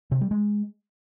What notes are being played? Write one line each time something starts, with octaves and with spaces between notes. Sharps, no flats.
C3
G3
G#3